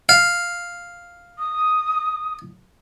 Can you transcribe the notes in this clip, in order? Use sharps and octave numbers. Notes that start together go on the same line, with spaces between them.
F5
D#6